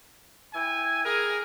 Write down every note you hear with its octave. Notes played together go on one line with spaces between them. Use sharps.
E4 G5 G#5
G#4 A#4